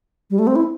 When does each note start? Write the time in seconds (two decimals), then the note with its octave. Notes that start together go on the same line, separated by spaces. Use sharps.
0.30 G3
0.39 A3
0.47 C4
0.56 E4